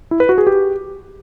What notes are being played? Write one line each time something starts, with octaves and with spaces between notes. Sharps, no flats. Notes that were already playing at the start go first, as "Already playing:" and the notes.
E4
B4
F#4
G#4
G4